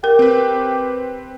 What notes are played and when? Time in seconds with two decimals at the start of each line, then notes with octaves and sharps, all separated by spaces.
0.04 G4 A#4
0.19 C4 B4